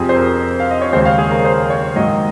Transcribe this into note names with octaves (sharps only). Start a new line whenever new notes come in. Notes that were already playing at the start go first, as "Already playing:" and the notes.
Already playing: F2 C3 F3 C4 G#4
C5
A#4
F5
D#5
C#5
D#2 C#3 G#3 C#4 C5
F5
G#4
A#4
C5
C#5
G#2 D#3 F#3 A#3 D#5